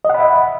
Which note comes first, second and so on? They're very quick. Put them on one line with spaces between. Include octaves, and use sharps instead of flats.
D#5 F#5 B5 E5